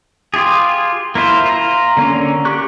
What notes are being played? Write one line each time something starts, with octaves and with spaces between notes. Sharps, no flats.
F4 G4 G#4
A#3 E4 F4 C5
F4 A#5
D3 A#3 C#4
G4 C#6 F#6